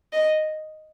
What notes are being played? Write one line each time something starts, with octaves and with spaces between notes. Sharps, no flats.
D#5